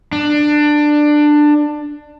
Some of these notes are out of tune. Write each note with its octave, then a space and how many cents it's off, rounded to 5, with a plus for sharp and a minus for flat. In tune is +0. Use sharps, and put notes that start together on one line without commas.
D4 +15